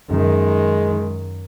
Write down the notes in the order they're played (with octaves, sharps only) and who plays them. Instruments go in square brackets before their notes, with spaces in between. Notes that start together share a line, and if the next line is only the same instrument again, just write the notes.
[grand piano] F#2 [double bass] D#3 [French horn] G#3